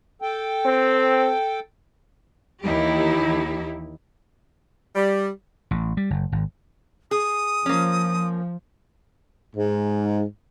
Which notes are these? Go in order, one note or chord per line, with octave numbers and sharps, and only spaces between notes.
A4 G5
C4
D#2 E3 D#4 E4 G4
G3
A1
G3
F#1
G#1
G#4 D#6
F3 A#3 C#4
G#2